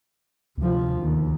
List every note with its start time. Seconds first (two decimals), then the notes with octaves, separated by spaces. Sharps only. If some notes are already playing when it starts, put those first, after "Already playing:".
0.58 D2 C3 F3
1.00 D#2